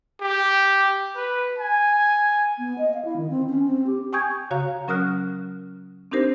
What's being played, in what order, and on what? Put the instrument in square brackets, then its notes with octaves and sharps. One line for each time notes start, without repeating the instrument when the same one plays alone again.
[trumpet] G4
B4
G#5
[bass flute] B3
D#5
F5
E4
D#3
C4
C#4
C4
G4
[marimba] G5 G#5 C#6 D#6 G6 G#6
C#3 F#4 C#5 F5 A#5
F#3 C#4 A#4 D#6 F6 F#6
C4 D4 D#4 G4 A#4 C5